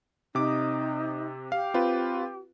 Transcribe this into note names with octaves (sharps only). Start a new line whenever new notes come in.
C3 C4 D#4 D6
G4 F5
C4 F4 B4